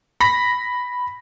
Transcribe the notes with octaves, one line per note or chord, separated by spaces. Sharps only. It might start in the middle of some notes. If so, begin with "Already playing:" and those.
B5 A#6 B6